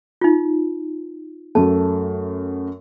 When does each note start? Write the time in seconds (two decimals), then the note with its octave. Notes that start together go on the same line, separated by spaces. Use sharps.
0.21 D#4 F4
1.55 F#2 A3 A5